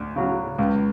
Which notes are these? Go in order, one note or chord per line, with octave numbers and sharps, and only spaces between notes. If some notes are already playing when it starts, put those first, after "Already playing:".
Already playing: D2
C#3 F#3
C#2